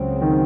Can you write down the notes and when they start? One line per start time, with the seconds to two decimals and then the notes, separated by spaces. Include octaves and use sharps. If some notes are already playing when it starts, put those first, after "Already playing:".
Already playing: C#2 C#3 F#3 C4
0.22 D#3